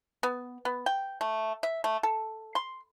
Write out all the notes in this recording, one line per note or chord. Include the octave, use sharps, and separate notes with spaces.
B3
B3
G5
A3
E5
A3
A4
C6